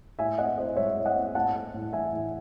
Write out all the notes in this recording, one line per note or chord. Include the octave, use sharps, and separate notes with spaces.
A2 E5 G#5
C4 D#5 F#5
E4 C5 D#5
G#3 C#5 E5
A2
D#5 F#5
C4
A2 F#5 A5
A3
A2
E3 E5 G#5
A2